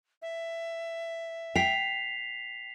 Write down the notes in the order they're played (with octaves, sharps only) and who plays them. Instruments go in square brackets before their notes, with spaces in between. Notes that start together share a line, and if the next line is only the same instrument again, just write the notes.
[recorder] E5
[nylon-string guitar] G5 [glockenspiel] B6 C7 F7